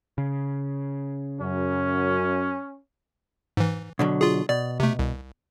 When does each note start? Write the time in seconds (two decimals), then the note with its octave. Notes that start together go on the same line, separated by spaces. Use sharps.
0.18 C#3
1.40 F#2 C#4
3.57 G#2 E3
3.99 B2 D3 F#3
4.21 F4 G#4
4.49 B2 D5
4.80 C3 A3
4.99 C2